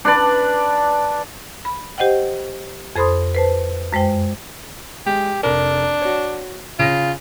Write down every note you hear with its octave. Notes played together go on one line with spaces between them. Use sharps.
D4 B4 D5
B5
G4 C5 D#5 F#5 G5
F2 A4 C5 B5 C6 D#6
B4 C5 A5
F#2 G#3 C5 G5
G#3 G4
F1 D4 A#4
F#4 C#5
C#3 F4 A#6